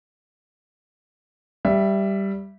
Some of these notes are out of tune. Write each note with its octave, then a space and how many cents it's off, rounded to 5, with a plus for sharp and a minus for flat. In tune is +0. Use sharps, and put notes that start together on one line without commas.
G3 +0 G4 +0 E5 +10